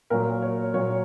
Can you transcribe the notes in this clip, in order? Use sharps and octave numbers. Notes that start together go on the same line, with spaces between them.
A#2 F#3 A#4
C#5
A#2 F#3 C#5